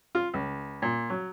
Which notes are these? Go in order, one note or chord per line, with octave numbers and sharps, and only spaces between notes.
F4
C#2
A#2
F#3